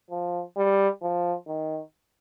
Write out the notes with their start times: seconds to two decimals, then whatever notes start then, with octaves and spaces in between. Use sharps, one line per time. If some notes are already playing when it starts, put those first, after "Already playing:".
0.10 F3
0.56 G3
1.02 F3
1.48 D#3